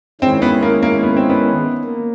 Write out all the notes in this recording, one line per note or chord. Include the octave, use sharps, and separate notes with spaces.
D#3 G#3 C4 C#4 E4
B3
A#3
A#3
B3
C4
B3
A#3